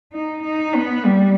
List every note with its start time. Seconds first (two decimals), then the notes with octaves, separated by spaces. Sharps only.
0.13 D#4
0.43 D#4
0.75 B3
1.05 G3